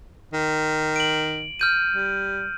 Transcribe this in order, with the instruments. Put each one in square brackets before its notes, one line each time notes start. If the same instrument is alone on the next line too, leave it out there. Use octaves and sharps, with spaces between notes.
[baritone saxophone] D#3
[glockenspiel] D7 F#7
F6 G6 D#7
[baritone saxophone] G3